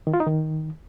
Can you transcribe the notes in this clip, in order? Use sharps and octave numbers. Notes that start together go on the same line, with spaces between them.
D#3
F4
D#4
D#3